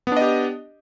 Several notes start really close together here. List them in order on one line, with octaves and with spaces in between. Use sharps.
B3 D4 D#5 G4